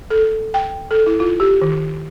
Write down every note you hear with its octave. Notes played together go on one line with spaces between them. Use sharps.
A4
G5
A4
E4
F4
G4
D#3